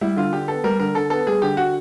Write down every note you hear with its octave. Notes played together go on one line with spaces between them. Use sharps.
G3 E4
D3 F4
D3 G4
B3 A4
G3 A#4
D3 A#4
D3 A4
B3 A4
G3 G#4
D3 G4
D3 F#4